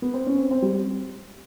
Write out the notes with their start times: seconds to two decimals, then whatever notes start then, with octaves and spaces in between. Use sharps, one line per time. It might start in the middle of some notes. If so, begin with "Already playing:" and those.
0.02 B3
0.14 C4
0.26 C#4
0.38 C4
0.51 C4
0.62 G3